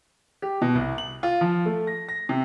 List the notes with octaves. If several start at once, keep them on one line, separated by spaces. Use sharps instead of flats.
G4
B2
C2
F#7
F4
F3
A3
A#6
A#6
C3